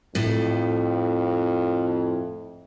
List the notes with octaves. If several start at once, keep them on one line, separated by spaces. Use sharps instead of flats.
F2 A2